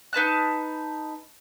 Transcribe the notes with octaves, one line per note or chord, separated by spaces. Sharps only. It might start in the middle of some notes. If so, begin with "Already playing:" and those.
D#4 B4 A5 F#6